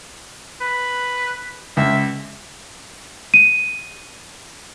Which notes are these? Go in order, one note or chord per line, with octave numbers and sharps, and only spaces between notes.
B4
C#2 E5
D#7